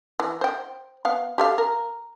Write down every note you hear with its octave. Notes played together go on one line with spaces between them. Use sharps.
E3
C5 G5
B3 F5
G4 A4 F5
A#4